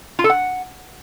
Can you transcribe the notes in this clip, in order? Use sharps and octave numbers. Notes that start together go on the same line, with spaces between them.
F4
A4
F#5